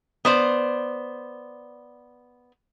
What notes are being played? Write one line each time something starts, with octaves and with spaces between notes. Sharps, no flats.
B3 C5 D5